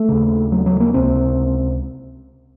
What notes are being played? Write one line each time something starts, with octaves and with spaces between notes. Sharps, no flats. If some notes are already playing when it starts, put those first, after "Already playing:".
Already playing: A3
D#2 C#3
F#3
F#3
A#3
C#2 C3 C4